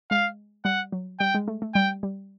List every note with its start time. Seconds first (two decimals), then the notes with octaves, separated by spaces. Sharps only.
0.11 G#3 F5
0.65 G3 F#5
0.92 F#3
1.20 G3 G5
1.34 G#3
1.48 A3
1.62 A3
1.74 G3 G5
2.03 G3